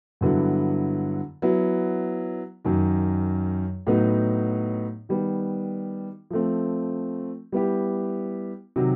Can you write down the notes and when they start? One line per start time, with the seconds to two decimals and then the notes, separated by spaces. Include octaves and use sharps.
0.21 G2 D3 F#3 B3 E4
1.42 F#3 B3 E4
2.65 F#2 D#3 F#3
3.87 A2 F#3 B3 D#4
5.09 D#3 G3 B3
6.30 F3 A3 C4
7.52 G3 B3 E4 G4
8.76 C3 D#3 F#3